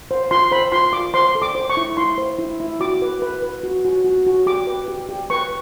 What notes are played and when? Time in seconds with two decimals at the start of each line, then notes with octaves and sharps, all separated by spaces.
0.11 C5
0.31 F4 C6
0.52 C5 B5
0.72 F4 C6
0.93 F4 D6
1.14 C5 C6
1.35 A4
1.42 D6
1.55 C5
1.70 C#6
1.77 E4
1.97 E4 C6
2.18 C5
2.39 E4
2.60 E4
2.80 F#4 D6
3.02 B4
3.22 B4
3.43 B4
3.63 F#4
3.85 F#4
4.05 F#4
4.27 F#4
4.46 G4 D6
4.67 B4
4.88 G4
5.09 G4
5.30 B4 C#6